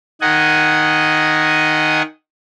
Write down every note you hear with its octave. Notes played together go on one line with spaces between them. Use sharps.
D#3 D#5 F#5 G#5